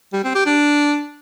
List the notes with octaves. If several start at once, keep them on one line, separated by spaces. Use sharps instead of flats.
G3
C4
G4
D4